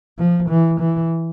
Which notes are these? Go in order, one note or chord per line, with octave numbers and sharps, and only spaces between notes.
F3
E3
E3